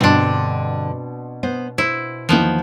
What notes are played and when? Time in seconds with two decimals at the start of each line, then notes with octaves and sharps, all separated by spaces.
0.01 G2 B2 D3 C4 D4 C6
1.43 B3 C5
1.78 E4 C5
2.29 E2 D#3 F3 A#3 B3 G5